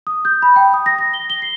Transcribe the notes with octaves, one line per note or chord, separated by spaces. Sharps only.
D#6
G6
B5
G5
D#6
A#6
A#6
G7
G7
C7